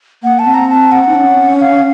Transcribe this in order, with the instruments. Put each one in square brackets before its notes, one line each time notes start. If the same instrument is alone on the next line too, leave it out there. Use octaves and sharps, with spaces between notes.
[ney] A#3 [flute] F#5
[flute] A5
[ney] C4
[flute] A#5
A5
F#5
[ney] D#4
C#4
[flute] F5